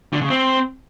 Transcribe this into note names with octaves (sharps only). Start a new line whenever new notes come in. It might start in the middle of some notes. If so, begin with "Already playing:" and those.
D3
C#3
C4